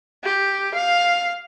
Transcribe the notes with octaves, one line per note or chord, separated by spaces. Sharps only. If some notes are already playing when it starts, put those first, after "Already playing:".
G4
F5